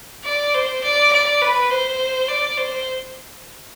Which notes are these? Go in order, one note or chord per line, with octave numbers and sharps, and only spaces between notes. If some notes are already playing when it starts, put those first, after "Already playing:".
D5
C5
D5
D5
B4
C5
D5
C5